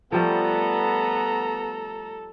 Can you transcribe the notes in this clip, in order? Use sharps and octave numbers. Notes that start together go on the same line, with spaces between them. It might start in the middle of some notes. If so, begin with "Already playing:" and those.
F3 G3 A3 B3 A4 A#5